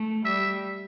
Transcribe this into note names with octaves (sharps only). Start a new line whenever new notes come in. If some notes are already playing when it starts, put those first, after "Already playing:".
Already playing: A3
G3 E5